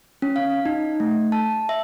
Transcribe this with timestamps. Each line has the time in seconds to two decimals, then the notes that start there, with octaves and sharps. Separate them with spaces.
0.22 C#4
0.36 F5
0.66 D#4
1.00 A3
1.32 A5
1.69 E5